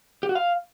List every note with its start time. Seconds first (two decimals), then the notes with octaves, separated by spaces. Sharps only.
0.23 G4
0.29 F#4
0.35 F5